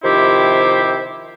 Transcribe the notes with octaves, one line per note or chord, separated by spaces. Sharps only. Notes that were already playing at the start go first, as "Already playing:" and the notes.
C3 D#3 F3 E4 G4 C5